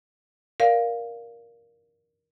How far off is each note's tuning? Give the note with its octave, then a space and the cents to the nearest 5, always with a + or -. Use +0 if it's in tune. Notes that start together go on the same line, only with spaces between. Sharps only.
A#4 +5 D5 +0 F5 +0